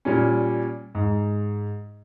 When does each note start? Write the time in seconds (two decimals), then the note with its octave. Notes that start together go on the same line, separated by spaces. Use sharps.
0.05 A#2 G3 C#4
0.95 G#2